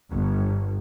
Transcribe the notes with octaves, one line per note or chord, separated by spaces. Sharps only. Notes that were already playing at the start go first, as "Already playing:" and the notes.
G1